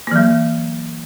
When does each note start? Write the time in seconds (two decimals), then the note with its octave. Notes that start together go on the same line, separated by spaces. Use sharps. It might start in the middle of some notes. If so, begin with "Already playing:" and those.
0.07 A#3
0.11 E3
0.16 F#3